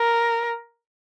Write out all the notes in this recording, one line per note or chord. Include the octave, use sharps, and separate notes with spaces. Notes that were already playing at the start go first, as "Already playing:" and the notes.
Already playing: A#4